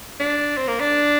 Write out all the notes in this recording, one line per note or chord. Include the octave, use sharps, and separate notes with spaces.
D4
C4
A#3
D4